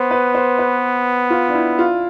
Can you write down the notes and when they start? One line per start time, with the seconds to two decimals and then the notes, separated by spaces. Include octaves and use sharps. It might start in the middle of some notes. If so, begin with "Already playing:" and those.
Already playing: B3 C5
0.11 B4
0.35 C5
0.59 B4
1.30 F4
1.49 D4
1.54 E4
1.79 F4